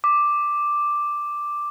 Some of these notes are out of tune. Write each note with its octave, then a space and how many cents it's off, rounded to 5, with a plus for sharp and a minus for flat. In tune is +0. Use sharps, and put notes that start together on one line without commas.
D6 +5